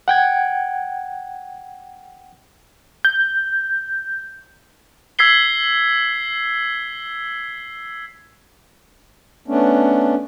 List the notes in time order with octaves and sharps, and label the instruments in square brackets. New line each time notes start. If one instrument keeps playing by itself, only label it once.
[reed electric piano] F#5 G5 G#6
[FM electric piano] G6
[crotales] E6 G#6 B6 C7 G7
[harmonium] A3 B3 C#4 D4